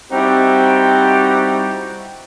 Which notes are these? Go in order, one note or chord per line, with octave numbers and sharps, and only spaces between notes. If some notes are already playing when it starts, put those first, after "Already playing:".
G3 C4 D#4 E4 F#4 G4